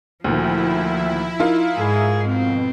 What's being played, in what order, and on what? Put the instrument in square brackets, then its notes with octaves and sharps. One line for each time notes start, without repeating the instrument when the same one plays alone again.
[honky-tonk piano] D2 A#2 D#3 [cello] F3 [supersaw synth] E4
[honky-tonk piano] D#4 F4 A#4
[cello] G#2 G#4
[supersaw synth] F2 B2 [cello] C4